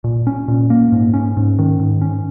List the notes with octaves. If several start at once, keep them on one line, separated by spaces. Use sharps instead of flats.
A#2
C#4
A#2
A#3
G#2
C#4
G#2
D#3
G#2
C#4